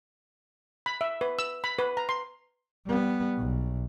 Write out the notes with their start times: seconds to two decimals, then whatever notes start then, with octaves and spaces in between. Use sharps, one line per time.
0.86 B5
1.01 E5
1.21 B4
1.39 E6
1.64 B5
1.79 B4
1.97 A#5
2.09 C6
2.87 G3 B3
3.37 B1